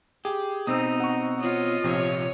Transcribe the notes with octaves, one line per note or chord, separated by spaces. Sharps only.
G4 G#4
B2 C4 D#4 D#6 E6
F#5 C#6
F4 C#5 D#5
A#1 C3 F3 C#5